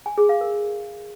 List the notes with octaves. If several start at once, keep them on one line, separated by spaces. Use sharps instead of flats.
G#5
G#4
F5
A#4